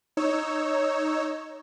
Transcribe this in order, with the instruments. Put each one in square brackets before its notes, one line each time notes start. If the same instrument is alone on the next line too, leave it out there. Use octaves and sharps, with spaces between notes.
[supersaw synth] D#4 C#5 E6